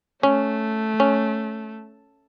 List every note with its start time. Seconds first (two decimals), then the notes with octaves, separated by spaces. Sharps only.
0.23 A3 C#4
1.00 C#4